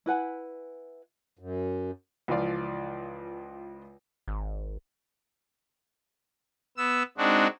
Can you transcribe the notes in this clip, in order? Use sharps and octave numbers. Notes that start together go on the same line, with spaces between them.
E4 B4 F#5 G#5
F#2
C#2 E3 F3 F4 D5
G#1
B3 E6
G#3 C4 D4 D#4 F#4